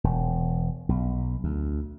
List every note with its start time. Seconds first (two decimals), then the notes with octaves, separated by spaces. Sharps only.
0.04 E1
0.89 B1
1.44 D2